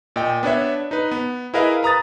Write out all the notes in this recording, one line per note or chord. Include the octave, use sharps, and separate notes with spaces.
A#2 D#5 G5
B3 D4 C#5 E5
D#4 B4
B3
E4 G#4 A#4 B4 D#5 F5
B4 A#5 D#6 A6